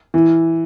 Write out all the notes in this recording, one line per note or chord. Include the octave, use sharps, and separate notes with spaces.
E3